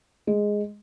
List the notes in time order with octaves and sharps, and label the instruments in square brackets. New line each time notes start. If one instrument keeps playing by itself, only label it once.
[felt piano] G#3